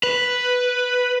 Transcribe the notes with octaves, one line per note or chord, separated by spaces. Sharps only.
B4